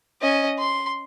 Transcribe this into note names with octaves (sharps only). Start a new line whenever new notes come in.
C#4 D#5
C6